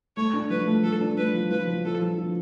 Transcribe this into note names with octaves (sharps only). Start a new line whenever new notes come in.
A3 C#5
D4
F3 B4
A3
F3 A4
D4
A3 B4
F3
F3 B4
F3
F3 A4
F3
F3